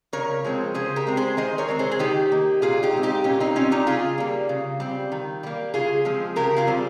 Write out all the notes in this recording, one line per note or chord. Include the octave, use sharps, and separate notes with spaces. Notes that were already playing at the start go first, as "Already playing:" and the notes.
C#3 A#4 C#5
F3 G#3 C4
C#3 G#4 C5
G4 A#4
G#3 C4
G#4 C5
D#3 C5 D#5
A#4 C#5
G#3 C4
G#4 C5
G#4
D#3 D#4 G4
A#3
A#2 F4 G#4
D#4 G4
G#3 C4
D#4 G4
A#2 C#4 F4
C4 D#4
G3 C4 C#4 F4
D#4 G4
C#3 F4 G#4
G3 A#3
C#3
G3 C4
D#3
G3 A#3
C#3 F4 G#4
F3 G#3 C4
C#3 G4 A#4
F4 G#4
G3 C4